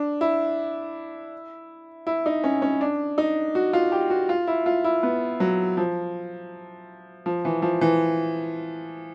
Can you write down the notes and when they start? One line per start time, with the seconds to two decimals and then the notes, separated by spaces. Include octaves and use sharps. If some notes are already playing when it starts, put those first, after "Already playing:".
Already playing: D4
0.21 E4
2.07 E4
2.26 D#4
2.44 C#4
2.62 C#4
2.81 D4
3.18 D#4
3.55 F#4
3.73 F4
3.92 G4
4.10 F#4
4.29 F4
4.48 E4
4.66 F4
4.84 E4
5.03 B3
5.40 F#3
5.77 F3
7.26 F3
7.45 E3
7.62 F3
7.81 E3